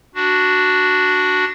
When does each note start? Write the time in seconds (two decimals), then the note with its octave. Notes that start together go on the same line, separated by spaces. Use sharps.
0.15 D4 F#4